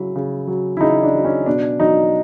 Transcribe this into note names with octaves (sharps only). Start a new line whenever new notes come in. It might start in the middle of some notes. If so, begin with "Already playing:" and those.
Already playing: C#3 F#3 E4
C#3
F#3
E4
C#3 D#4
D4
F#3
C#4
B2 D4
F#3 D#4